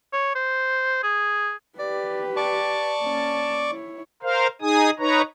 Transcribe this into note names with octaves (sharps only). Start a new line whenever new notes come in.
C#5
C5
G#4
G4 B4 D5
D5 A5 C#6 D6
A#3 C#4
E4 C#5
A#4 C5 F5
D#4 G#4 G#5 D#6
D#4 B4 C#5 A#5